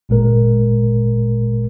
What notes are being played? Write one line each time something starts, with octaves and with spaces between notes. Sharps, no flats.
G1 A#2 G#3 A#4